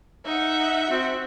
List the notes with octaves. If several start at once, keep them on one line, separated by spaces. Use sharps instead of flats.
D#4 E5 F#5
C4 F#4